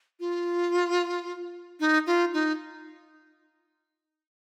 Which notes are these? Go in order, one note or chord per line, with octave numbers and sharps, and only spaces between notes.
F4
D#4
F4
D#4